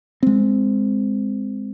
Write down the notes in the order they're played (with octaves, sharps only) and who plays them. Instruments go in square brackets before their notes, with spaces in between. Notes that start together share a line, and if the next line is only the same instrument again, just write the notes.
[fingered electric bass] G#3 C4